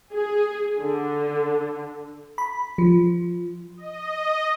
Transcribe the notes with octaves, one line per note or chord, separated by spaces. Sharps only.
G#4
D3
B5
F3
D#5